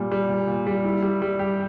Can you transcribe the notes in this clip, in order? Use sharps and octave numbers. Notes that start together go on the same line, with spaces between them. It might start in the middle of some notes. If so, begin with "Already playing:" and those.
Already playing: A#2 G3
G3
A#2
A#2
G3
E4
G3
G3
G4